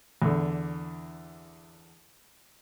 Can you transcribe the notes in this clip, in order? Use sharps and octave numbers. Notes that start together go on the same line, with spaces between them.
E2 D3